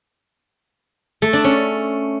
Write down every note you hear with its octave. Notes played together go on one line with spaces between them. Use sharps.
A3
D4
C#4